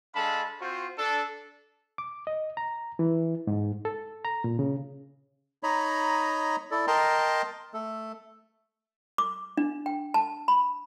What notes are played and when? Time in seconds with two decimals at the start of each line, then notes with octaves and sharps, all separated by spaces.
0.14 G#3 D4 A4 F5 A5 B5
0.60 C4 F4 F#4 C5
0.97 D4 A4
1.98 D6
2.27 D#5
2.57 A#5
2.99 E3
3.47 G#2
3.85 A4
4.25 A#5
4.44 A#2
4.59 C#3
5.63 D#4 C#5 D#5 A#5 B5
6.71 E4 A4 D5
6.87 A#4 D#5 G5 A5 A#5 C6
7.74 A3 A4
9.18 D6
9.57 D4
9.86 G5
10.14 A5
10.48 B5